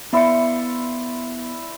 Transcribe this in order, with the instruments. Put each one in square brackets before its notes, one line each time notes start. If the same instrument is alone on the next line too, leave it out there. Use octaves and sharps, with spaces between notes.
[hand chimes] B3 C#7 [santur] E4 D5 C6